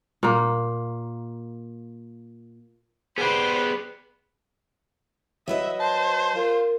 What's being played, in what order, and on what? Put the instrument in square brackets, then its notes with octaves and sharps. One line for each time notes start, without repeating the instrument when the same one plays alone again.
[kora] A#2 A#3
[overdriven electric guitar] B3 G4 [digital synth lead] G#4 [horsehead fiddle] B4 [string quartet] C5 D5
[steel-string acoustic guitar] F#3 B4 D#5 [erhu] E5
[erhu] C5 [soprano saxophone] A5
[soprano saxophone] F4 [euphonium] A#4